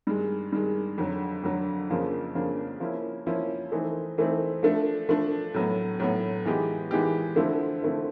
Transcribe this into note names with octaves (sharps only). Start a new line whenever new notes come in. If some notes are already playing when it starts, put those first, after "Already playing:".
G2 D#3 G#3
G2 D#3 G#3
F2 D3 F#3
F2 D3 F#3
F2 C#3 F3 A#3 D4
F2 C#3 F3 A#3 D4
F3 A#3 C#4 E4
F3 A#3 C#4 E4
E3 A3 C4 D#4
E3 A3 C4 D#4
F3 A3 D4
F3 A3 D4
A2 F#3 B3
A2 F#3 B3
E3 G#3 B3 D#4 G4
E3 G#3 B3 D#4 G4
D3 F3 A3 C4 E4
D3 F3 A3 C4 E4